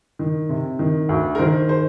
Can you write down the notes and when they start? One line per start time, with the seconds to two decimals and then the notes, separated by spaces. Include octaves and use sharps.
0.19 D#3
0.49 C3
0.79 D#3
1.09 D2
1.35 A#4
1.39 D#3 C5
1.69 C5